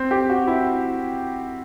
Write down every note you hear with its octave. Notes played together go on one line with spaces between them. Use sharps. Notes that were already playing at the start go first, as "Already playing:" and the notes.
Already playing: C4
G4
F#4
E4